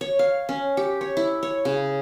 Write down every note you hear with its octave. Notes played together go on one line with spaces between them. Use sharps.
C#5
F5
C#4
G4
C#5
E4
C#5
C#3